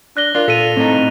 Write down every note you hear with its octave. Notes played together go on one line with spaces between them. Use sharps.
D4 F#6 A#6 G7
D4 F4 A#4
A#2 A4 B6 D#7 F7
A2 C4 D#4